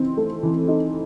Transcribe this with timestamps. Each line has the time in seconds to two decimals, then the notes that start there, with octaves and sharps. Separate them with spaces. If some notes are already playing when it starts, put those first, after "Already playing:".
Already playing: E3 C4 D#4
0.17 A3
0.43 E3
0.68 D#4